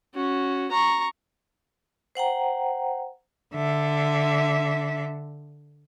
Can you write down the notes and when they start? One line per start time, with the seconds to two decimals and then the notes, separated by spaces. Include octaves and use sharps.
0.15 C#4 F#4
0.71 A#5 C#6
2.15 C5 F#5 G5 A#5
3.54 D3 E5